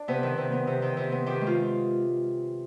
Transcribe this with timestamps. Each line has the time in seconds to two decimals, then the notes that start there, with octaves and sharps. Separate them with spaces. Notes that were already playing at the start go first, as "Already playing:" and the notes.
Already playing: D4 D5
0.08 C3 B3 B4
0.23 D#3
0.37 C3
0.52 B3
0.67 C3
0.82 D#3
0.97 C3
1.12 B3
1.26 D#3 G4
1.41 G#3
1.47 F4